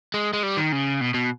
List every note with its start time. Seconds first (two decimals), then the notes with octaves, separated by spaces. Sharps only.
0.14 G#3
0.33 G#3
0.43 G3
0.57 D#3
0.72 C#3
1.01 B2
1.14 B2